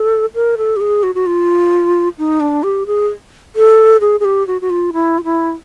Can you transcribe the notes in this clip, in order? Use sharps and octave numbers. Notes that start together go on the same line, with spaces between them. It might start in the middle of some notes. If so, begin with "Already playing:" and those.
Already playing: A4
A#4
A4
G4
G#4
F#4
F#4
F4
D#4
D4
G4
G#4
A4
G#4
G#4
G4
F#4
F#4
F4
E4
F4
E4